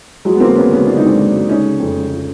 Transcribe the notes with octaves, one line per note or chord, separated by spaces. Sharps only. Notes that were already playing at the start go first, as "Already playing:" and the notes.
F3 F#3 G#3
B3
D2 A#3 C4
C#3 B3 C#4
D2 B3 C#4
C#3 D4
D#4
D2 C4 D4
D2
D2
C#3 C#4 D#4
C#3
F2
C#3
F3